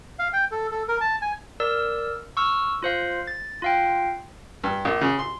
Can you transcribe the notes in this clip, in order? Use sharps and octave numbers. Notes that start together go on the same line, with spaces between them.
F5
G5
A4
A4
A#4
A5
G#5
A#4 D5 E6
C#6 E6 F6
F4 C5 F5
A6
F4 F5 G5
G2
A#1
C#3
C6